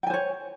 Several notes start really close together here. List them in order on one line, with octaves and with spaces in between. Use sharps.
G5 G#5 C5 C#5